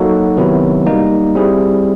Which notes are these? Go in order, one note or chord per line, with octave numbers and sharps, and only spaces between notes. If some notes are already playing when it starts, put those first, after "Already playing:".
Already playing: F#3 A#3 D#4 F#4 A4
C3 D#3 F#3 B3 E4
G3 A#3 D#4
G3 C4 E4 G#4